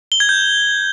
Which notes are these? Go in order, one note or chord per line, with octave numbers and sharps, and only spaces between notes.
G7
G#6
G6